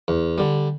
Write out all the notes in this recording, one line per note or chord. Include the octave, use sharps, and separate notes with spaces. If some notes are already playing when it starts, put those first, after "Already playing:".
E2
D3 G3